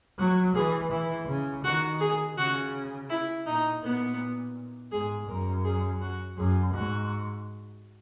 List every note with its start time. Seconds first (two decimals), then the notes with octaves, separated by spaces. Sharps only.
0.18 F#3 F#4
0.55 E3 G#4
0.91 E3 E4
1.28 C#3
1.64 D#3 F#4
2.00 G#4
2.37 C#3 F#4
3.10 E4
3.46 A#2 D#4
3.83 A#2 B3
4.92 G#2 G#4
5.28 F#2 A#4
5.65 G#4
6.01 F#4
6.38 F#2 G#4
6.74 G#2 F#4